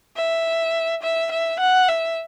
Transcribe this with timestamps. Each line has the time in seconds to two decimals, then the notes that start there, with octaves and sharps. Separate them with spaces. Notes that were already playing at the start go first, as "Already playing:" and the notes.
0.17 E5
1.03 E5
1.32 E5
1.60 F#5
1.89 E5